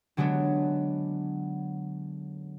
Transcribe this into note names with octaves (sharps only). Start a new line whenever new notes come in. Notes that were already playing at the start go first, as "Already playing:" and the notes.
D3 F#3 G#3 B3 D4